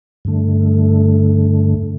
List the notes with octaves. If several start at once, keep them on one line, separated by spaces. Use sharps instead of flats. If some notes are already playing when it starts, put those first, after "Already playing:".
G2 D3 A3